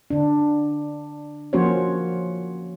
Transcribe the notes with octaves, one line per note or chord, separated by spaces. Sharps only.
D3 D4
F3 A#3 C#4 F#4 C5 C#5